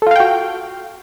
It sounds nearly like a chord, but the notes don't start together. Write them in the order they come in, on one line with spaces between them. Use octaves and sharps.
A4 F4 F5 G5 F#4